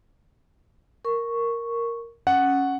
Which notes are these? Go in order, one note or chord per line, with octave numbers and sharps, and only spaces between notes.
A#4 C#6
C#4 F#5